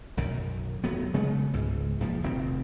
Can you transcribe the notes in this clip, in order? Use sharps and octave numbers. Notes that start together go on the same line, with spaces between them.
B1 F#2 D#3
D#1 F#3 B3
C#3 G#3 A3 B3
C#2 G#2
E2 A#2 F3
F1 D#3 C4